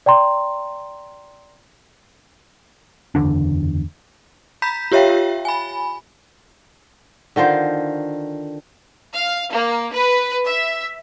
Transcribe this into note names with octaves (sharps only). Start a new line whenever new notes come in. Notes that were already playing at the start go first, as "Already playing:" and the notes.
D5 G5 A#5 C6
F#1 E2 D3 D4
A#5 B5 G6 B6
F4 G4 C#5 E5 F5 G5
G#5 B5
D3 D#3 F4 C5
F5
A#3
B4
E5